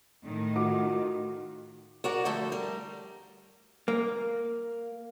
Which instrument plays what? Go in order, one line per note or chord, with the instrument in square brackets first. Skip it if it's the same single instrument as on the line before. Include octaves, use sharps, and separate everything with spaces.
[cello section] A2 D#3
[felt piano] F4 F#4 D6
[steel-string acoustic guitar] F#4 A#4 D5 F#5
D3 F3 A3 A4
G3 A#4
[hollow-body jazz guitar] A#3